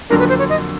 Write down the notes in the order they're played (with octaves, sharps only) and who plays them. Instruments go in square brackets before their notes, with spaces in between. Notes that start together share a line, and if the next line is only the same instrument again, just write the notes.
[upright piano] F2 D3 F#3 A#3 D4 [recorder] A#4
[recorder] B4
C5
C#5
D#5